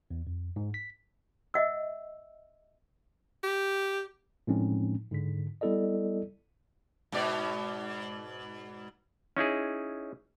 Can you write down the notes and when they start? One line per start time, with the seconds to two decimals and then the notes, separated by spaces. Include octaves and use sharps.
0.11 E2
0.27 F2
0.56 G#2
0.74 B6
1.54 D#5 E5 F#5 E6
3.43 G4
4.47 A2 F3 G#3 C4 C#4 D#4
5.11 G#2 D3 B6
5.61 G3 B3 E4 A4 D5 D#5
7.12 G#2 B2 D5
9.37 C#4 D#4 E4 G#4